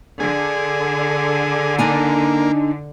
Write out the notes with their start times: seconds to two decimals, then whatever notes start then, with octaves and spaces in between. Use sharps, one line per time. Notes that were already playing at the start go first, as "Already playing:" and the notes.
0.20 D3 G#4
1.79 A#3 D4 D#4 G#5